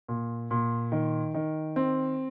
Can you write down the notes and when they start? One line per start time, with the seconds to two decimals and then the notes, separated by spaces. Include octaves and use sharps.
0.08 A#2
0.51 A#2
0.92 D#3
1.34 D#3
1.76 C4